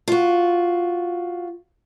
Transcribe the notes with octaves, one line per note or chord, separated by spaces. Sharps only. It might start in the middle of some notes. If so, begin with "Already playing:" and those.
F4 F#4